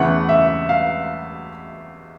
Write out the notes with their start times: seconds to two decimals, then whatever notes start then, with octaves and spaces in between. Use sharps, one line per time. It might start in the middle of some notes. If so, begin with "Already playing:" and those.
Already playing: E2 C#3 E3 A3 F#5
0.29 E5
0.69 F5